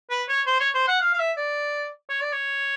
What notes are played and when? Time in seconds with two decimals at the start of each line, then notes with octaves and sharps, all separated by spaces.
0.10 B4
0.29 C#5
0.47 C5
0.60 C#5
0.74 C5
0.88 F#5
1.01 F5
1.13 F5
1.19 E5
1.37 D5
2.10 C#5
2.21 D5
2.32 C#5